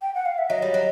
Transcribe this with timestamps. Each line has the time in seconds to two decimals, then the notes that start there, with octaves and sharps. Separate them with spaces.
0.02 G5
0.15 F#5
0.26 F5
0.38 E5
0.50 F#3 D#5
0.62 G3
0.74 F#3